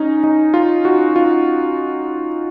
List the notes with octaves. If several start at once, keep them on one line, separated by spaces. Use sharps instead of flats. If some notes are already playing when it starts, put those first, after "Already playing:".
Already playing: C#4 D#4
D#4
F4
F#4
F4